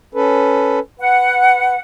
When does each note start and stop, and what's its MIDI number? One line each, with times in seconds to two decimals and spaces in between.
0.15 0.79 61
0.15 0.79 69
0.15 0.79 71
1.00 1.75 71
1.00 1.80 78